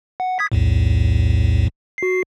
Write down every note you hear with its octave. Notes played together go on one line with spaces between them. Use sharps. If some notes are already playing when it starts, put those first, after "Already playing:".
F#5
D#6 G#6 B6
B1 E2 A2
F#4 C7